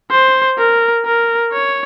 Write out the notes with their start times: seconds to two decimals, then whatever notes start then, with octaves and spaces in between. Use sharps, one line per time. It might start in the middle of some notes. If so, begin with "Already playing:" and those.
0.11 C5
0.58 A#4
1.06 A#4
1.53 C#5